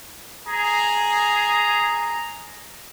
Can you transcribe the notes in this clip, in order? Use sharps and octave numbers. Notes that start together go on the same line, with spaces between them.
G#4 A#5